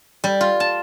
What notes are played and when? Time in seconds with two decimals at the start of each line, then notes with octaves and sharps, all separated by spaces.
0.24 G3
0.41 F4
0.60 A5